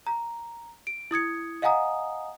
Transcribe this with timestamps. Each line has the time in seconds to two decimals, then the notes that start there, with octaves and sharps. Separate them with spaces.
0.07 A#5
0.87 D7
1.11 E4 D#6 G#6 C#7
1.62 D#5 F5 F#5 G#5 A#5 D#6